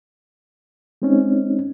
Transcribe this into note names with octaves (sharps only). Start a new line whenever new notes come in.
G#3 C4 C#4 D#4